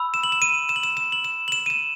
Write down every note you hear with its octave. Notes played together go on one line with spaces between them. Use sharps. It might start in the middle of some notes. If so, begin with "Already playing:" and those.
Already playing: B5 E6
E7
F#7
E7
D#7
E7
F#7
E7
E7
F#7
E7
F#7
E7
D#7
E7